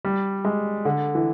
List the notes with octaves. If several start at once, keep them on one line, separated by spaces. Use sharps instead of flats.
G3
G#3
D3
E3